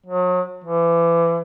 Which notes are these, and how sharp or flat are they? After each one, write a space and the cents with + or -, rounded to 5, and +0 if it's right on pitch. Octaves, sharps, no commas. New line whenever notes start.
F#3 -35
E3 +30